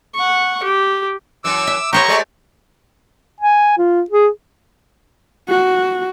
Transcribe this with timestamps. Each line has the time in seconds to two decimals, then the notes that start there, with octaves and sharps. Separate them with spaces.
0.15 F#5 C#6
0.63 G4
1.44 F#2 E3 D6 E6
1.67 E5
1.93 A#3 C4 G4 C5 C#5 A#5 C#6
2.08 G#3 A3 D5
3.41 G#5
3.78 F4
4.10 G#4
5.49 F#4